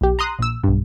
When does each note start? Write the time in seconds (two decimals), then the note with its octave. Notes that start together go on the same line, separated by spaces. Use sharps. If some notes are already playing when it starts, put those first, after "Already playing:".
0.01 B1 G4
0.19 A#5 C6 D#6 F#6
0.39 A#1 E6
0.64 B1 G2